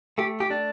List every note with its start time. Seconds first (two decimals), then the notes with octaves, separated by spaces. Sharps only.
0.18 A3 G4
0.40 G4
0.50 D4